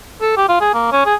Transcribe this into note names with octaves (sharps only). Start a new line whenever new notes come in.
A4
G4
F4
G#4
A#3
C#4
G#4